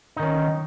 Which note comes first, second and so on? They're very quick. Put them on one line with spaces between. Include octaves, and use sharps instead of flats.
D#4 D#3 C#4